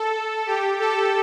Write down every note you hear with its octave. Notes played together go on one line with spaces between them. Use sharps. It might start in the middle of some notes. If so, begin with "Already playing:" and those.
Already playing: A4
G4
A4